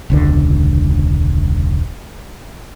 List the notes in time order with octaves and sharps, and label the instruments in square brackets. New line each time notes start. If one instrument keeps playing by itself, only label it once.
[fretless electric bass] E1 C#2 D3